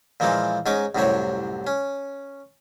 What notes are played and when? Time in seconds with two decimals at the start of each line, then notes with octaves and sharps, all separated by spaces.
0.20 A#2 E3 F3 G#3 A#3 C4
0.66 G#2 C#4 D#4 G#5 D6
0.95 C2 F#2 A2 C3 C4 C#5
1.67 C#4